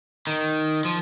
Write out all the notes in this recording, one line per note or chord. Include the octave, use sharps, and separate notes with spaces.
D#3
F3